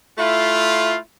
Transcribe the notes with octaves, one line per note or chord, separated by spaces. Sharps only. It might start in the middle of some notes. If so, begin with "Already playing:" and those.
A3 E4 F4